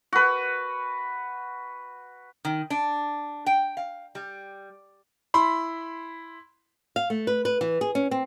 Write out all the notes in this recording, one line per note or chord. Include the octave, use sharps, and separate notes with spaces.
F#4 B4
D#3
D4
G5
F5
G3
E4 B5 C6
F5
A3
B4
B4
E3
G#4
C#4
C4